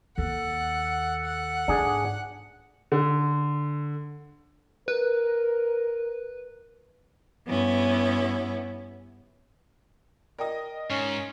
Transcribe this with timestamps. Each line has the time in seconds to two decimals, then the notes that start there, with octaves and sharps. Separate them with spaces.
0.18 D#2 A4 F#5
1.25 F#5
1.68 G#2 D4 G#4
2.92 D3
4.88 A#4 B4
7.46 G2 B3 C#4 E4
10.38 A#4 D5 D#5 G5 D#6
10.90 G#2 C#4